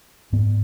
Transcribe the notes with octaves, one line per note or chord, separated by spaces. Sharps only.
G#2 B3